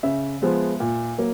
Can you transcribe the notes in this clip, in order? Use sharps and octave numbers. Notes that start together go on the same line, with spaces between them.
C#3 E5
F3 G#3 B3
A#2
F#3 A#3